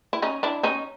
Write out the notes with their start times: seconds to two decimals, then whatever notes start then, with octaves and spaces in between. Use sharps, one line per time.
0.13 E4
0.22 C#4 D#4
0.43 D4 E4
0.63 C#4 D#4